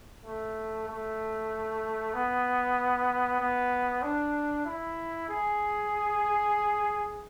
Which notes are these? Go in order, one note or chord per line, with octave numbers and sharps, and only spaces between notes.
A3
A3
B3
B3
D4
E4
G#4